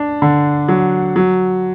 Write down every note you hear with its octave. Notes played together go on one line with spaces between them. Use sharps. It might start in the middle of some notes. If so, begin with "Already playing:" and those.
Already playing: D4
D3
F#3
F#3